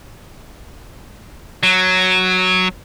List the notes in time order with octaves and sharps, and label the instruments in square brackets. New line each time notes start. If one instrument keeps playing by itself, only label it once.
[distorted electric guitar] F#3